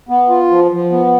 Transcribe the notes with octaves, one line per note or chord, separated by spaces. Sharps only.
B3
F4
F3
F3
B3